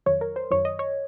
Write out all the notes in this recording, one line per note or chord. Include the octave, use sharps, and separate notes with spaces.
F2 D#3 F#3 C#5
A#4
C5
F#2 D#3 F#3 C#5
D#5
C#5